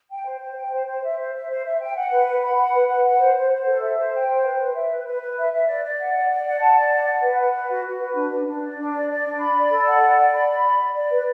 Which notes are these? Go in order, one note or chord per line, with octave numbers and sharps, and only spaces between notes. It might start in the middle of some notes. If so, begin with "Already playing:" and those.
G5
C5
C5
G5
C5
C5
E5
C5
E5
C5
E5
G5
F#5
B4
F#5
B5
F#5
B4
F#5
F#5
C5
C5
C5
A4
E5
C5
G5
C5
B4
B4
E5
B4
B4
B4
E5
E5
D5
D5
F#5
D5
D5
F#5
A5
D5
F#5
F#5
B4
F#5
B4
F#4
F#4
B4
D4
D4
D4
D5
D4
D5
D5
D4
B5
D5
A4
F#5
D5
D5
B5
B5
D5
D5
D5
B4